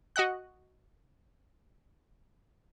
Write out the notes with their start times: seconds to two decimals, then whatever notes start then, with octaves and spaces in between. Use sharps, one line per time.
0.16 F#4 D#5 F#5 F#6